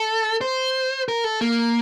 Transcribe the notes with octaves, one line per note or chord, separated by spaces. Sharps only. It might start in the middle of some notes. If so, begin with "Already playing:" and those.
Already playing: A4
C5
A#4
A4
A#3